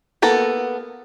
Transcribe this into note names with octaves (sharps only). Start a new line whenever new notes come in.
A#3 B3 A4 A#4